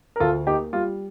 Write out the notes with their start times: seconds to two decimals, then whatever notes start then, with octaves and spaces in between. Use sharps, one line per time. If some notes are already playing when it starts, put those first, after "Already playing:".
0.16 A#4
0.20 D2 F4 A4
0.47 A#3 D#4 G4
0.73 G3 F4